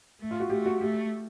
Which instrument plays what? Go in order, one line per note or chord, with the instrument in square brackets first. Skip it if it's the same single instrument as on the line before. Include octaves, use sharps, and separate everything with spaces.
[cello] A3
[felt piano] F4
F#4
[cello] A3 [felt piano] G4
[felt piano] F#4
[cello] A3 [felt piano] G4